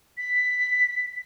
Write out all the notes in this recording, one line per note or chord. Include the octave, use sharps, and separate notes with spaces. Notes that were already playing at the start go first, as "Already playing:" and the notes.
B6